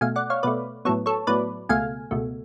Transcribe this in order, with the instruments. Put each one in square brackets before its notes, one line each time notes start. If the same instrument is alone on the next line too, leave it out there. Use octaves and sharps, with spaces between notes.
[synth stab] B2 A3 F5 G#5
D5 F#5
C#5 F5
B2 A3 B4 D5
A2 F#3 B3 A4 C#5
A4 C#5
A2 F#3 B3 B4 D5
C#2 B2 A3 F5 G#5
C#2 B2 A3